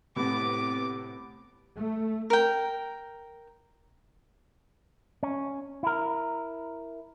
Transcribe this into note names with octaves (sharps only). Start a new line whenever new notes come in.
A2 C3 B3 D6
A3
A#4 G5
C#4
E4 A#4